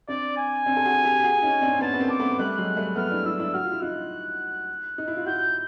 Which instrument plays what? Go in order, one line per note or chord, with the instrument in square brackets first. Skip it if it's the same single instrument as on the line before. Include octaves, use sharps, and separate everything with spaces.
[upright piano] C4 D4 [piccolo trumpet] D5
[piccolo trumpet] G#5
[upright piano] C4 D4
A4
F#4 G#4
G4 A4
G4
F#4 G#4
C#4 D#4
C4 D4
C4
[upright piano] B3 C#4 [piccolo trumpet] A5
[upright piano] B3
A#3 C4
[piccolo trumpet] D6
[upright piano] A3 B3
[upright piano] G3 A3 [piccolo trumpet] F#6
[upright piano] F#3 G#3
[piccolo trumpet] F#6
[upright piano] G3 A3
[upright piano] A3 B3 [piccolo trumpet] F6
[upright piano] D4 E4
[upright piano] D4 E4 [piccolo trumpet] E6
[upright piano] D4 E4
[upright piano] F#4 [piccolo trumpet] F6
[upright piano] F4
E4
[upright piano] D#4 F4 [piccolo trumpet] F#6
[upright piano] D#4
E4
F4
[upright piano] E4 F#4 [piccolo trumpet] G6